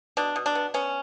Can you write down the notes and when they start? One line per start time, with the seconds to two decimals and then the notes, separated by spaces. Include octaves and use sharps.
0.17 B2 D4
0.36 B2
0.46 D4
0.55 B3
0.74 B3 C#4